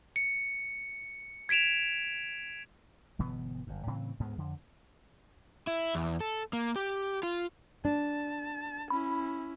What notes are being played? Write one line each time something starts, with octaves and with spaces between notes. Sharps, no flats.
C#7
G#6 B6 D7 E7 F7
G1 B2 E3 B3
G1 F#2
A2 C#3 E3 C4
D2 G#2 G#3 B3
F2 D3
E4
E2
A4
A#3
G4
F4
D4 A5
C#4 E4 B5